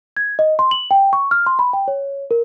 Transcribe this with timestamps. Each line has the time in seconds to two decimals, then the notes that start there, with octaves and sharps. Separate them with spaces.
0.17 G#6
0.39 D#5
0.59 C6
0.71 F#7
0.91 G5
1.13 C#6
1.31 F6
1.47 C6
1.59 B5
1.73 G5
1.88 C#5
2.31 A#4